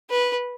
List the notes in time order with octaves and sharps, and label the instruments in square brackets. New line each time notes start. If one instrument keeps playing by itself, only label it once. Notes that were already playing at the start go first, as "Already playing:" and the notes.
[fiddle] B4